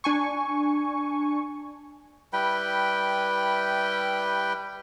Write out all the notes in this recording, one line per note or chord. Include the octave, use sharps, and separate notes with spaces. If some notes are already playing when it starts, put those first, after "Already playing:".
D4 G#5 C#6
G3 E4 B4 G5